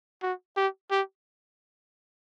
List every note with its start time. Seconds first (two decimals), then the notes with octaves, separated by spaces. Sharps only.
0.23 F#4
0.57 G4
0.91 G4